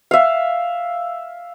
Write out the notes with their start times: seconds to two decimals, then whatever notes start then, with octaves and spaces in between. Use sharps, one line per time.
0.11 E5 F5